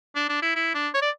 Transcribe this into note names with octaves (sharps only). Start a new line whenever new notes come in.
D4
D4
E4
E4
D4
C#5
D5